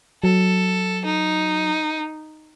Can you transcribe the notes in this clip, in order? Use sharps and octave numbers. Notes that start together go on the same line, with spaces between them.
F#3 A4
D#4